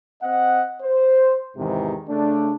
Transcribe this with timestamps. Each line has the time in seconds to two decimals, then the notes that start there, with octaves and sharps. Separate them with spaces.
0.23 C4 D#5 F#5
0.82 C5
1.57 E2 G#2 C3 D#3 E3
2.09 C#3 A3 D4